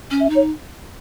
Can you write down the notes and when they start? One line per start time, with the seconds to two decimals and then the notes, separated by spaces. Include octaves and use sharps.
0.11 C#4
0.20 E5
0.30 D#4
0.35 C#5